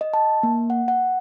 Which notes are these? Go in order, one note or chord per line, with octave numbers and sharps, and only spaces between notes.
D#5
A5
A#3
F#5
F#5